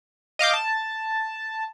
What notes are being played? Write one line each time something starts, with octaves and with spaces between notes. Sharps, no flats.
D#5 F5 D6 G6
A5